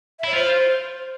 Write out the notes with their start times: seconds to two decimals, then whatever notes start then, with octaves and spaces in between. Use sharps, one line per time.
0.19 E5
0.24 E4 C#5
0.33 F4 C5